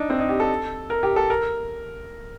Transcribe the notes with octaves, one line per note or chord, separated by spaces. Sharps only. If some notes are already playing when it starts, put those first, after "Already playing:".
Already playing: D4 D#4
C4
D#4
G4
A4
A#4
G4
A4
A#4